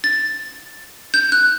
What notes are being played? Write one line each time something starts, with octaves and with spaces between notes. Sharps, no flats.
A6
G6
F#6